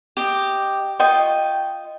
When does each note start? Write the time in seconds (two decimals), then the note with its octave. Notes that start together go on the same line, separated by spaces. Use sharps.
0.17 G4 D#5
0.99 F4 D#5 G5 C#6